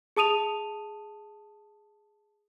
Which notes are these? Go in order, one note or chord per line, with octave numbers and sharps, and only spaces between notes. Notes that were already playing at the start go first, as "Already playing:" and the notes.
G#4 A5 D#6 D#7 F7